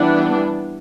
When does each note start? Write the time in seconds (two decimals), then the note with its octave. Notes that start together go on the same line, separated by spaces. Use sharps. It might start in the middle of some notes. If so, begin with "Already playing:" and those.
Already playing: E3 G3 B3 D4